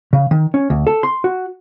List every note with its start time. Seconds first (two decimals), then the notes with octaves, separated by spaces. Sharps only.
0.13 C#3
0.31 D#3
0.54 C#4
0.70 D2
0.87 A4
1.03 C6
1.24 F#4